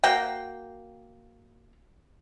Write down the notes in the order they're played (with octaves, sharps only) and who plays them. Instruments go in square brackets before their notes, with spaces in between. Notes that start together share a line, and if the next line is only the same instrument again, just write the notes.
[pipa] A#3 F#4 G5